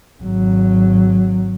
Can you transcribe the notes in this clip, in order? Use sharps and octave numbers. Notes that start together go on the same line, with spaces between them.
G#1 F#3